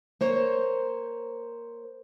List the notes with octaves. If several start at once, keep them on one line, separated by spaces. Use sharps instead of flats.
A#3 C5 C#5